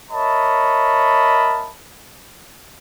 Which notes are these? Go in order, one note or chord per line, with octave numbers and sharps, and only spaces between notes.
A#4 C#5 D#5 E5 A5 B5